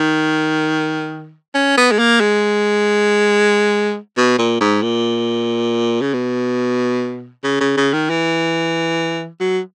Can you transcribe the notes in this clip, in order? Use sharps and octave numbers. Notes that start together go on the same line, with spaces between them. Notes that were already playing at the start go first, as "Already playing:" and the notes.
Already playing: D#3
C#4
B3
G#3
A#3
G#3
B2
A#2
G#2
A#2
C#3
B2
C#3
C#3
C#3
D#3
E3
F#3